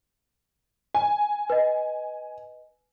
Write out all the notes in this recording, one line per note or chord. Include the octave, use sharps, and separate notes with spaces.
G#5
B4 D#5